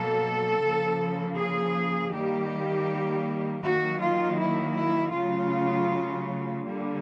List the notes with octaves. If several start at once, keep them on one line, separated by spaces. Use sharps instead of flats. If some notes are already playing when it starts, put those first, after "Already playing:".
Already playing: B2 F#3 A#3 A4
C#3 F3 A#3
G#4
D#3 G3 A#3 G4
D#3 F#3 A#3 F#4
F4
E4
E4
C#3 F#3 A3 F4
D3 G3 A#3